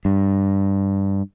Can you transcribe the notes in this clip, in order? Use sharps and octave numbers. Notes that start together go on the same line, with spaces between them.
G2